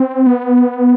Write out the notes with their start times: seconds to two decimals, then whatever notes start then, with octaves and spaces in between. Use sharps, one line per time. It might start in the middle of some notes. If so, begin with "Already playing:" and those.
Already playing: C4
0.26 B3